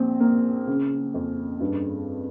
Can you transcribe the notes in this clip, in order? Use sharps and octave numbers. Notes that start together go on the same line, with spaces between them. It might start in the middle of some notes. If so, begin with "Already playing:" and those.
Already playing: A#1 C4
A#3
C#3
F2
G2